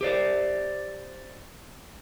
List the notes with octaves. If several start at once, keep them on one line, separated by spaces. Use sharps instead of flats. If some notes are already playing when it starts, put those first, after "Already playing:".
G4 C5 D5